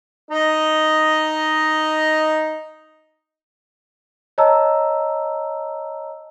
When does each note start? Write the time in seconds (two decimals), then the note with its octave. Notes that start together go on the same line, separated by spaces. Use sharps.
0.31 D#4 D#5
4.38 C#5 D#5 A5 A#5 E6